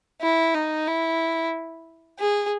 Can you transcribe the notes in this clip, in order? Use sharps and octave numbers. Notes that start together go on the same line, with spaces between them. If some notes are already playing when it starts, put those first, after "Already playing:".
E4
D#4
E4
G#4